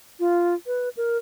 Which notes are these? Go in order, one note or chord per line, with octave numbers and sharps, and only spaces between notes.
F4
B4
A#4